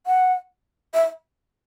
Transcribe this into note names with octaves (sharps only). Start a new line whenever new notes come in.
F#5
E5